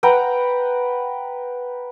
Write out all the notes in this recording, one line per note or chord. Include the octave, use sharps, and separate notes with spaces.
B4 F#5 G5 A#5